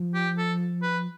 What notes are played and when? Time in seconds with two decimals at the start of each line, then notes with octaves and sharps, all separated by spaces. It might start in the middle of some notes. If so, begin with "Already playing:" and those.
Already playing: F3
0.14 G4
0.38 A4
0.82 B4